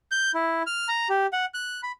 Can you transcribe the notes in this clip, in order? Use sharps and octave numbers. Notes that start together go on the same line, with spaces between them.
G6
E4
F6
A#5
G4
F#5
F#6
B5